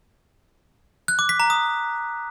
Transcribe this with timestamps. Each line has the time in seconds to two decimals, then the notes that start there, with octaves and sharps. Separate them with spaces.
1.08 F#6
1.19 D6
1.29 B6
1.40 A#5
1.50 D#6